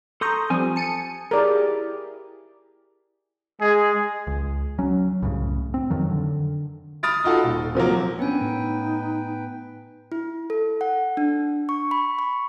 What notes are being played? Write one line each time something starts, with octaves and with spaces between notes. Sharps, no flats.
A4 A#5 C6 C#6 D#6 G6
F3 G3 C4 G#5 D#6
A5 C#7 D#7
E4 G4 G#4 A#4 D5
G#3 G#4
C#2
F#3 C#4
C2 F#2 A2 C#3
C4
F2 D#3 F3 F#3
D3
B5 D#6 F6 A6 D7
D#4 F4 F#4 A4
D#1
C3 F3 F#3 A#3
B3 C#4 D4 B4 G5 G#5
A2 D#4
E4
A4
F#5
D4
C#6
B5
C#6